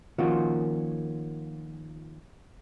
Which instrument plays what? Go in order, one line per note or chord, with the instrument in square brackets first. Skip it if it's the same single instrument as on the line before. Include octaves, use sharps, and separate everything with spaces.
[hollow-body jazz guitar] D#3 F3 A#3 C#4 F4 F#4